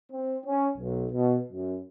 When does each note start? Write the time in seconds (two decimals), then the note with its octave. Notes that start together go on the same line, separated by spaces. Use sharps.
0.12 C4
0.46 C#4
0.78 B1
1.12 B2
1.52 F#2